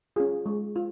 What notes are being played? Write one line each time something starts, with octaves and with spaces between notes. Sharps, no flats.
C#4 F4 G#4
G#3
F4